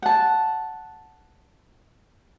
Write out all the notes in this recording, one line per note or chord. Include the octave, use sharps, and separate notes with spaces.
F#5 A5